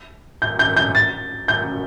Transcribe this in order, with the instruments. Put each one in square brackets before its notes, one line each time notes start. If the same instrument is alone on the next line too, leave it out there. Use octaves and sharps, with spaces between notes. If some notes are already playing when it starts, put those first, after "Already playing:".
[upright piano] G6
G6
G6
A6
G6